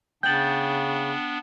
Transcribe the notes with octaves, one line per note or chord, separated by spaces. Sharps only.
C#3 B3 D4 G5 G6 A6 F#7